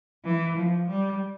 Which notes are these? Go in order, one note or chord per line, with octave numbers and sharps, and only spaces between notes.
E3
F3
G3